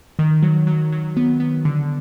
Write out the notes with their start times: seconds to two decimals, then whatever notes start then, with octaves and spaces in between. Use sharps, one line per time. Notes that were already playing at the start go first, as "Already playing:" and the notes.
0.19 D#3
0.43 F#3
0.67 F#3
0.92 F#3
1.17 B3
1.40 B3
1.65 D3